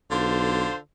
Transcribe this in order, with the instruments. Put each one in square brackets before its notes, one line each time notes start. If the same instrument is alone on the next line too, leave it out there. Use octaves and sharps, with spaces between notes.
[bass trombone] B1 [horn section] D3 F4 C5